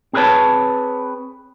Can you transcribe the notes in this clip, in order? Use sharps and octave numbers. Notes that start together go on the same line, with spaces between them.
C4 G#4 A#4 B4 C#5 A5